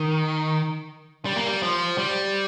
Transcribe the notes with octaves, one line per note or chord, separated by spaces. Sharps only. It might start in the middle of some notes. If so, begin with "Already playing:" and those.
Already playing: D#3
G3
A#3
G3
F3
G3